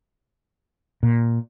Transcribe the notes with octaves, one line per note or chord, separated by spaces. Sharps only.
A#2